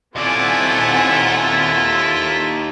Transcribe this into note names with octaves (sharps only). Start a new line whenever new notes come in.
D#2 A3 C4 E4 F4 D5 F#5 G#5